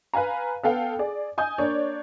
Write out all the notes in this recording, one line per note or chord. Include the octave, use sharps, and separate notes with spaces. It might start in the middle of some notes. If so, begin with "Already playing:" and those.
B4 F5 G#5 A#5
B3 A4 F5 G5
G#4 D5
D#5 G#5 D#6 G6
A#3 D4 C#5 D5